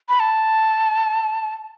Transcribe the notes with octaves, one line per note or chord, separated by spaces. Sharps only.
B5
A5